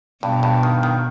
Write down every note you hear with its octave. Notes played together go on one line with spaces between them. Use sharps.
G2 B2
G2
D#3
D#3